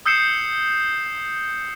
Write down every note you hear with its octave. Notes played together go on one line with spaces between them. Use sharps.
D#6 E6 G6 C7 C#7 E7